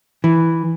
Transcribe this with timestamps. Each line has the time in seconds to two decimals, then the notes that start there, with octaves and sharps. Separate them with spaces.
0.24 E3